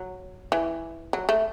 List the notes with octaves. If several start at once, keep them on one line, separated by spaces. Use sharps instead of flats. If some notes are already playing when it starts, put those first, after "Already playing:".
Already playing: F#3
E3
F#3
A3